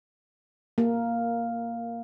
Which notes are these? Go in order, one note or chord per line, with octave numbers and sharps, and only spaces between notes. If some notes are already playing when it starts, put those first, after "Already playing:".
A#3